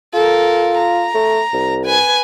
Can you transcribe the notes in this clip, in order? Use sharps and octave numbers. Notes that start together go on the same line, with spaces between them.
F4 A4 A#4
A#5
A3
C2
B4 G#5